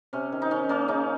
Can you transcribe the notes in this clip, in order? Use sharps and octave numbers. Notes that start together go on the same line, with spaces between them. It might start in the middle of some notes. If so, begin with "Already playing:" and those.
C3 C#4
D#3
D#4
D#3 C#4
A#3 C#4
C#3 D#4